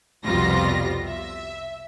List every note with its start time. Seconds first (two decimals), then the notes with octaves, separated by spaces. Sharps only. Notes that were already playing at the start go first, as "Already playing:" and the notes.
0.25 C2 F2 B2 G3 F4 A#6
1.06 E5